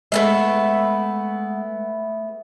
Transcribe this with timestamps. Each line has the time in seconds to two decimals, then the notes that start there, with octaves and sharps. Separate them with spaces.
0.12 G#3 A3 B3 E4 F#5